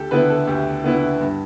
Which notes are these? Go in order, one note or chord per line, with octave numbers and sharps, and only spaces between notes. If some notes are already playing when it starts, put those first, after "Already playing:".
Already playing: D2 G4 A4
D3 B3 E4 B4
A4
D2 G4
D3 B3 E4
G2